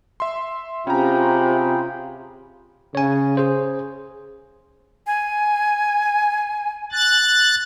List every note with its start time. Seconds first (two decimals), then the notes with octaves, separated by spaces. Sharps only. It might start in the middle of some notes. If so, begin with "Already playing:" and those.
0.20 E5 C6
0.87 C3 C#4 F4 G#4 G5 A#5 B5
2.95 C#3 C#5 G#5
3.37 G#4 C5
5.07 G#5
6.92 F#6 A6